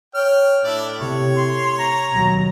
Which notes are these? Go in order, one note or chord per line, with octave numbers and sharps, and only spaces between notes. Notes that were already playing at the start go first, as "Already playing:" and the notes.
C#5 G5 F6
A2 D4 E4 D5
C3 C#5
C6
A#5
D#2 B2 F#3